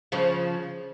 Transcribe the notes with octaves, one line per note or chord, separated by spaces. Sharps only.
C#3 F3